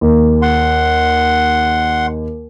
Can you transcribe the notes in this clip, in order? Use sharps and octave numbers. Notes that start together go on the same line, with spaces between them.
D#2
F#5 C6